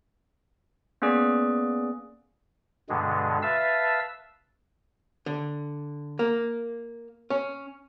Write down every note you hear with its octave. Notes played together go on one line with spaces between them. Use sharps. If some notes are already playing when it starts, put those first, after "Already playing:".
A#3 B3 C#4 G#4 D5
G2 B2 D3 G#3
B4 E5 F5 A5 E6
D3
A#3
C#4